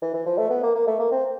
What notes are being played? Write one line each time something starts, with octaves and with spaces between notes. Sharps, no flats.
E3
E3
F3
A3
B3
A#3
A#3
A3
A#3
C4